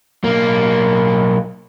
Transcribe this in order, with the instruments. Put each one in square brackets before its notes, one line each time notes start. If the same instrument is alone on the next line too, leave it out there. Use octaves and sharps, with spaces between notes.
[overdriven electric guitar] B1 A#3